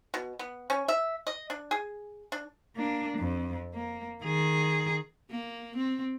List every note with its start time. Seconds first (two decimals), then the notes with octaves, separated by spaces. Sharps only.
0.14 B2
0.39 B3
0.70 C#4
0.88 E5
1.27 D#5
1.50 D4
1.71 G#4
2.32 D4
2.76 A#3 D4
3.18 F2
3.74 A#3
4.23 D#3 G#4
5.30 A#3
5.76 C4